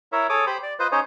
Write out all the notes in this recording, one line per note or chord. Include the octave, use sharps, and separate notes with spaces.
E4 A#4 C#5 E5
G#4 A4 C#5 D6 D#6
G4 C5 B5
D5
F4 B4 C5 D#5
C#4 D#4 G#4 C5 C#5 D#5